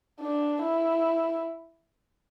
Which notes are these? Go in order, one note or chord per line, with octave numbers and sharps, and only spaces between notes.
D4
E4